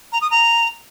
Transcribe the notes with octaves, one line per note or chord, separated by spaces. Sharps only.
A#5
D#6
A#5